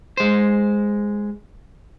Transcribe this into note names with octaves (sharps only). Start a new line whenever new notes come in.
G#3 C5